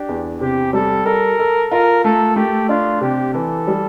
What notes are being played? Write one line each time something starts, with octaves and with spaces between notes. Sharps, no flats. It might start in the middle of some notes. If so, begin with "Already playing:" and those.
Already playing: D4 G4
E2
C3 G4
G3 A4
A4 A#4
A4
F4 A#4
A3 A4
A3 G4
D4 F4
C3 G4
E3 A4
G3